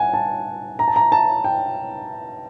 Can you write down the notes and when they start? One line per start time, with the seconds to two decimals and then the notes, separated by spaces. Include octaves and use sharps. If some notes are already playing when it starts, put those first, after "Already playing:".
Already playing: F#5 G#5
0.14 A5
0.79 A#5
0.88 A5
0.96 A#5
1.12 A5
1.44 G5